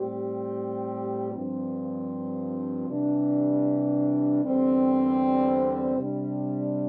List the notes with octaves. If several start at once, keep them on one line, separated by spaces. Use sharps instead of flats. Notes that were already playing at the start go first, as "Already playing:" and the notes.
Already playing: A2 G3 C4 G4
G2 F3 C4
C3 E3 G3 D4
E2 D3 G3 C4 G4
C3 G3 D4